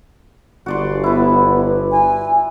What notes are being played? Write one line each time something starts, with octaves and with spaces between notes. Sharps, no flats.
G1 F#4 D5 C6
B3 E4 B4
G#5